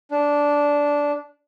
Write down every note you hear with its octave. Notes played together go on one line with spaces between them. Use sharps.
D4